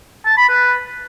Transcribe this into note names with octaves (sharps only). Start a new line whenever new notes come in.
A5
B5
B4